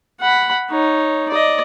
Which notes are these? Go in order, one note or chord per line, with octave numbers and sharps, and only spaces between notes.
F#5 B5
D#4 C#5
D5 D#5